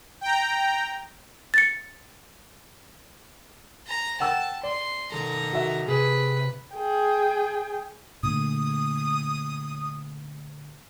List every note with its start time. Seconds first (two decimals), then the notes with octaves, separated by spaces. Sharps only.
0.21 G5 A#5
1.54 A6 C#7
3.87 A#5
4.20 F#5 G5 A5 E6
4.63 D5 C6
5.12 D#3 A4 A#5
5.53 F#4 E5
5.88 C3 G#4 B4
6.74 G#4 G5
8.23 A#2 D3 A3 D#6